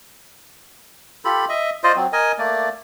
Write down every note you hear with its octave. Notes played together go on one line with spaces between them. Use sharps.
F4 G4 A4 B5
D#5 E5
F4 C5 D5 D#5
F#3 C4
A#4 D#5 G#5
A3 A#3 D5